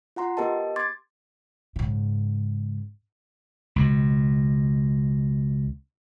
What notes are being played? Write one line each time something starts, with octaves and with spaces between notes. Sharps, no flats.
F4 F#5 A#5 C6
B3 G4 A#4 D#5 A5
C6 D6 G#6 A6
G#2 C#3
C#2 B2